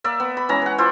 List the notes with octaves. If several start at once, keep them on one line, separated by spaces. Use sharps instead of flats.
A#3 D5 E5
B3
B5
E3 G#3 C#4 A#5
B4 F#5
E4 F4 C5 D5